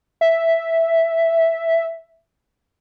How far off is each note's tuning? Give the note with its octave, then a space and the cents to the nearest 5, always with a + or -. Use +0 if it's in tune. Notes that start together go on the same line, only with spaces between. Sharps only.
E5 +0